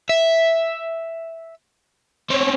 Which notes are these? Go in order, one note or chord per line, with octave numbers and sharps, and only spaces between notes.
E5
C4 C#4